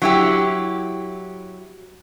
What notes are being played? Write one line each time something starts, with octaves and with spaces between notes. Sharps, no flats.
F#3 E4 G4